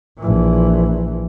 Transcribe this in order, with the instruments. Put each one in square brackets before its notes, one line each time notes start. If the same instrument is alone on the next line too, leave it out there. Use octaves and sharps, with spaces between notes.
[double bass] A#1 E3